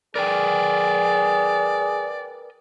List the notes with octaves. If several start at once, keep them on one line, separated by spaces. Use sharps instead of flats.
G#4 A#4 B4 D5 G5